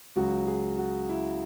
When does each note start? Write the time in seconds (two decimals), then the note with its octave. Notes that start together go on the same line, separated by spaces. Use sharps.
0.16 C#2 C#3 F#3 F#4
0.47 G#4
0.78 F#4
1.09 E4